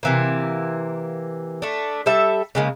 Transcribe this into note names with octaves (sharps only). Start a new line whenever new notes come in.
C3 E3 A#3
A3 D4
G3 A4 E5
C#3 G#3 A#3